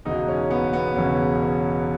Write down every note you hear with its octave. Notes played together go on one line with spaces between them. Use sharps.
E1 E2 C#3 D#4
C#4
B3
B3
E1 E2 C#3 C#4
C#4